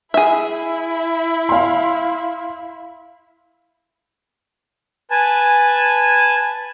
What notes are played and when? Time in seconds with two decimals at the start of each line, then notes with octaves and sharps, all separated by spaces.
0.14 E4 G#4 E5
1.49 F5 C6
5.11 B4 G#5 A5